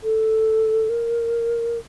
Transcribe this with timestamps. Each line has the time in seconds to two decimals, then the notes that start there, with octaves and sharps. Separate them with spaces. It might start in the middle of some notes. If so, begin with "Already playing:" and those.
0.03 A4
0.89 A#4